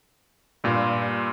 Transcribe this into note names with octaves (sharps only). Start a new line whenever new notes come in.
G2 A#2 F4